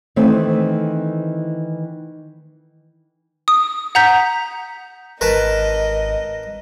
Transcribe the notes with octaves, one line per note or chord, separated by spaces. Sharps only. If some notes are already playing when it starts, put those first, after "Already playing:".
D#3 E3 A3 C4
D#6
F#5 A#5 G6 B6
G#1 A#4 B4 D#5 A5